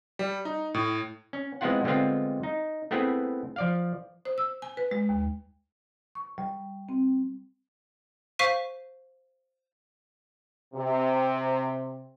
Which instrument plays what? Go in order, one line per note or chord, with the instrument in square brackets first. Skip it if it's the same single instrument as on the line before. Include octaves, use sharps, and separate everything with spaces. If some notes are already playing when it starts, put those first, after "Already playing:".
[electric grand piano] G3
D#4
A2
[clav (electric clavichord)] C#4
G#3 B3 C4 E4 F4 F#5
D3 G3 G#3 B3 C4 F4
D#4
A3 B3 C4 E4 G#4 B4
F3 D5 F5
[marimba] C5
E6
G#5
B4
G#3
D#2
C#6
G3
C4
[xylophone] C5 F5 C#6 B6 D#7
[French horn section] C3